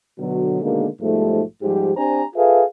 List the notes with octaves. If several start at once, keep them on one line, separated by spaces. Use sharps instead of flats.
B2 D3 F#3
B2 D3 D#3 G#3 A#3
B1 G#2 F3 G3 A3
G#2 F3 G3 G4
C4 D4 G4 C5 G#5 A#5
F4 G#4 A4 B4 E5 F5